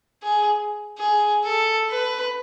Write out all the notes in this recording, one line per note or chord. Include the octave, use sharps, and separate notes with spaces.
G#4
G#4
A4
B4